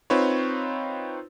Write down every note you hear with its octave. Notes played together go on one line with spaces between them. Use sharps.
C4 D#4 F4 B4 C#5